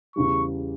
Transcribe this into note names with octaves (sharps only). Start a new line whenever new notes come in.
E2 C#3 G3 C#6